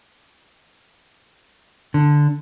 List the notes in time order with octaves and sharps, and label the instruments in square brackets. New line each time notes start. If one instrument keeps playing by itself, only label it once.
[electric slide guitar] D3